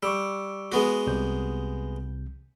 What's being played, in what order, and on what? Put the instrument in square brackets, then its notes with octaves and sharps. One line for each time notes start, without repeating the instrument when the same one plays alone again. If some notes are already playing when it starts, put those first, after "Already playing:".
[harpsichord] G3 [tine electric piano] C#6 D6 E6
[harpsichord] G#3 B3 F#4
[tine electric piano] C2 C3 G6